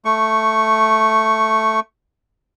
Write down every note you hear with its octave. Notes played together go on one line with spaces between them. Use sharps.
A3 C#6